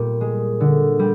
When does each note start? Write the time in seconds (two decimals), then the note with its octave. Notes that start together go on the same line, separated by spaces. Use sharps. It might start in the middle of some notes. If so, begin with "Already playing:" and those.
Already playing: A#2 G3
0.21 G#3
0.60 D3
0.99 G3